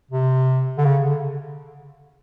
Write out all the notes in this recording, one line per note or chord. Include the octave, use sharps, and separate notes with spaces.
C3
D3
C#3
D3